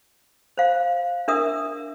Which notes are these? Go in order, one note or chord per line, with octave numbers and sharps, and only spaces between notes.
C5 F5
D4 A#4 E5 D#6